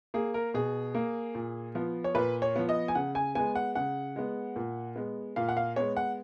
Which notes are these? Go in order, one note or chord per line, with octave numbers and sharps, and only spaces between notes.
A#3 G#4
A#4
B2 G#4
A#3
A#2
F3 B3
C#5
A#2 B4
C#5
F3 B3
D#5
G#5
C#3 F#5
G#5
G#3 B3 G#5
F#5
C#3 F#5
G#3 B3
A#2
G#3 B3
A#2 F5
F#5
F5
G#3 B3 C#5
F#5